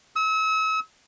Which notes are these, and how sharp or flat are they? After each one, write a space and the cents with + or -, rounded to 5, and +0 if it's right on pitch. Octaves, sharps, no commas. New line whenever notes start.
E6 -40